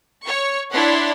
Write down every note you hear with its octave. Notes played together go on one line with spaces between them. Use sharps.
C#5 C#6
D4 E4 C#5 F#5 B5 C6